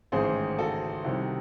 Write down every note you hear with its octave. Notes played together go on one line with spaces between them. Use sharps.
A1 G#2 D#3 G#4 C5
F#4 A4
C2 C3 D#3